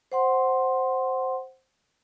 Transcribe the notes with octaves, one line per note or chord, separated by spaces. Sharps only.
C5 F#5 C6